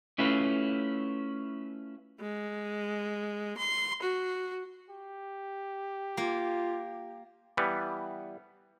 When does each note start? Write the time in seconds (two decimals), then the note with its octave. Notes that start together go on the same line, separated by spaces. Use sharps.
0.18 A3 C#4 E4 F4 B4
2.20 G#3
3.57 C6
4.02 F#4
4.90 G4
6.17 A#3 F4
7.57 E3 G3 B3